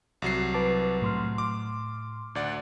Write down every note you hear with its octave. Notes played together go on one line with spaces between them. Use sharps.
C2 F#3 C7
B4 A5 D6
A2 C6 F6
D6
D2 D5 F#5